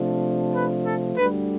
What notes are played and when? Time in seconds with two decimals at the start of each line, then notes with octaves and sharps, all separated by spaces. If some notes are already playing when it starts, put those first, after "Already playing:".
Already playing: C3 F3 A3 D4
0.54 B4
0.85 A4
1.16 D2 D3 G3 B4